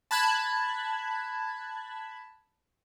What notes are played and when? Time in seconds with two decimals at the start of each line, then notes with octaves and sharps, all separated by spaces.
0.11 A5 B5 F#6 G#6